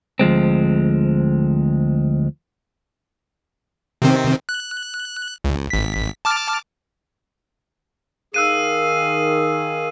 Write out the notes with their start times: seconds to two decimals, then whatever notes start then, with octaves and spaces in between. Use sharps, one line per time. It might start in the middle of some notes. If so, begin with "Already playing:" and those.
0.19 D2 F3 G#3 C4
4.02 C3 D#3 C4
4.49 F#6
5.44 C#2
5.70 G#1 B6
6.25 A5 D6 F6
8.34 D#3 G#4 F5 E6 F#6 D#7